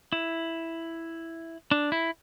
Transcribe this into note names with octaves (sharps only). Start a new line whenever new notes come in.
E4
D4
E4